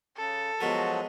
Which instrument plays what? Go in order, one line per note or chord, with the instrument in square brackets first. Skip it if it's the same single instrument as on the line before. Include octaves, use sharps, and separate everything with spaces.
[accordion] C#3 [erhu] A4
[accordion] F3 F#3 F#4 [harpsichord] G#3 B3 A#4